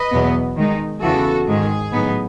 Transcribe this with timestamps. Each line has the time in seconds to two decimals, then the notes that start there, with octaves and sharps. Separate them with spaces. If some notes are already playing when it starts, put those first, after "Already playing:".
Already playing: B4 D#5
0.11 E2 B2 F#3 B3
0.57 D#3 G#3 D#4
1.02 E2 C#3 E3 F#4 A4
1.47 G#2 D#3 G#3 G#4
1.93 A2 F#3 B3 D#4